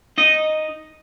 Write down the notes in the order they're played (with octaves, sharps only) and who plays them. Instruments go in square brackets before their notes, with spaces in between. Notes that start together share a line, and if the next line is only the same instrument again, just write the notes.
[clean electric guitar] D#4 D#5